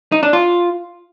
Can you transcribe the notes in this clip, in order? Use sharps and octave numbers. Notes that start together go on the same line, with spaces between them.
D#4
D4
F4